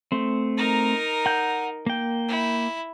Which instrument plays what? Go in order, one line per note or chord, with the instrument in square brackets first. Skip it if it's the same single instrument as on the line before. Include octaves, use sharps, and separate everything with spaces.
[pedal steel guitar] A3 C4
[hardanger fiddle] D#4 A#4
[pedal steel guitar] F#5 G6
A#3 G5
[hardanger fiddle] E4